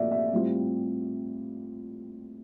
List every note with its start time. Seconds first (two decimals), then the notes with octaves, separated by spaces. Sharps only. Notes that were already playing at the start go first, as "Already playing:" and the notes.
Already playing: A#1 A#2 A3 D5 E5
0.11 E5
0.33 A2 G3 C4 F4